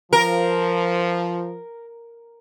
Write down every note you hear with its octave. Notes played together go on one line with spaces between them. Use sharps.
F3 A#4